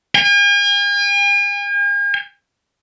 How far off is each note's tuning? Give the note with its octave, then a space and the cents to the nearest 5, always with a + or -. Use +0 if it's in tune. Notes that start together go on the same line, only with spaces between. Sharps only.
G#5 -45